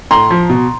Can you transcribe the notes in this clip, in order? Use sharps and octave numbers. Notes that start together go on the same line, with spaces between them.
A2 A#5 C6
F3
B2